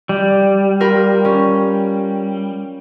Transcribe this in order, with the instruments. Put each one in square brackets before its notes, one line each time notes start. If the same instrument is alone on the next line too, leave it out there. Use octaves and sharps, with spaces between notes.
[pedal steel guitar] G3
[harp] F4 A#4 B5
C#4